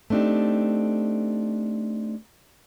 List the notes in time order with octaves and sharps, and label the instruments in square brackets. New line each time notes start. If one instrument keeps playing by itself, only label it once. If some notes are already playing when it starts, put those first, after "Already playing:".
[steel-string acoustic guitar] A3 C4 D4 D#4 G4